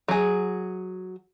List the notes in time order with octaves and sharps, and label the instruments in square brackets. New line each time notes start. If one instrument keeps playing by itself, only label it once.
[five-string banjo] F#3 G#4